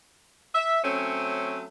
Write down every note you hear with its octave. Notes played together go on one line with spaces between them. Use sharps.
E5
F#3 A3 C4 C#4